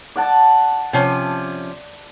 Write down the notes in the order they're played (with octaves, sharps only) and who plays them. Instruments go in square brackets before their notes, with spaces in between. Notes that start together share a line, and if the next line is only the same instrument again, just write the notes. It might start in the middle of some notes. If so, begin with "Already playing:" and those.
[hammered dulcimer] D5 F#5 A5
[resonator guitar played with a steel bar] C3 F3 C#4